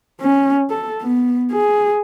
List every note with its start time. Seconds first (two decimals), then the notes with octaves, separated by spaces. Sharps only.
0.20 C#4
0.70 A4
1.02 B3
1.52 G#4